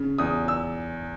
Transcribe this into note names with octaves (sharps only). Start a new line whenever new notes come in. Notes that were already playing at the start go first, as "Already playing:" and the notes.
Already playing: C#3
E2 D#6
E6